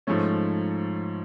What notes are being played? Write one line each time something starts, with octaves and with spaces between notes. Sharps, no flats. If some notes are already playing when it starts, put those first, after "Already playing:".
G#2 F3 A3 C#4